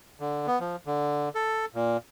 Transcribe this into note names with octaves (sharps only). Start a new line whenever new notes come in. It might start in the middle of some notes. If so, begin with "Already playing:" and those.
D3
B3
F3
D3
A4
A#2